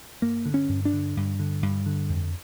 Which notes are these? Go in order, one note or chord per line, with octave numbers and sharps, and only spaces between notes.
G2 A#3
D3
C#4
G2
D4
D3
G2
D3
G2
D3
F2